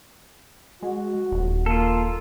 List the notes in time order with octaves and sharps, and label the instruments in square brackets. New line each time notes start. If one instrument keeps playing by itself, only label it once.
[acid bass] G#3 [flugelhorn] F#4
[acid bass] D#1
[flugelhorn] A#3 [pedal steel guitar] F4 A4